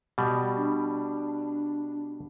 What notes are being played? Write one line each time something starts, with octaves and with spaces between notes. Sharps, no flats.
B2 G3
D4